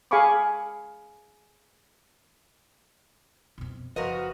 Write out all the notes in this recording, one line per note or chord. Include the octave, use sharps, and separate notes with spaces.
G#4 F5 G#5 B5 C#6 D6
F2 B2
F#1 F3 F#4 A#4 B4 D#5